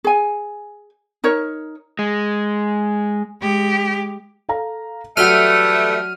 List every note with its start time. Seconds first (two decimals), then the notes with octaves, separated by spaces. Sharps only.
0.04 G#4 G#5
1.24 D#4 A#4 C#5
1.99 G#3
3.41 G#3 G4
4.49 A4 F5 A#5
5.17 E3 F#3 G3 A3 F#4 F#5 F6 D#7